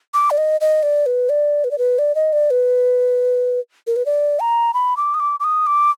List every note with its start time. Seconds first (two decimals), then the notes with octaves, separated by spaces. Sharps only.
0.14 D6
0.31 D5
0.38 D#5
0.61 D#5
0.83 D5
1.06 B4
1.29 D5
1.64 B4
1.71 D5
1.78 B4
1.99 D5
2.15 D#5
2.33 D5
2.51 B4
3.87 A#4
3.96 B4
4.06 D5
4.40 A#5
4.74 B5
4.97 D6
5.14 D#6
5.20 D6
5.40 D6
5.44 D#6
5.67 D6